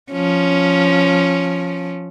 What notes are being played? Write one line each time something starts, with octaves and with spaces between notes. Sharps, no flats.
F3 C#4